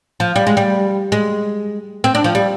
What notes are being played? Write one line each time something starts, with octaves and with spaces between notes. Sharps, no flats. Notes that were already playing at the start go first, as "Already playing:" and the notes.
F3
G3
G#3
G3
G#3
C4
D4
F3
G3